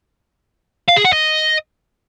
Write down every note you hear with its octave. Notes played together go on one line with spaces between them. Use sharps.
F5
G#4
F#5
D#5